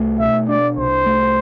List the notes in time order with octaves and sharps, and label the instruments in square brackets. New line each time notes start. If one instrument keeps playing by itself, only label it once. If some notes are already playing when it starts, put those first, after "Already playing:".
Already playing: [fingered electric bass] C2 A3
[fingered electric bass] B2 [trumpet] E5
[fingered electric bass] D4 [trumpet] D5
[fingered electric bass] C2 [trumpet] C5
[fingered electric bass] A3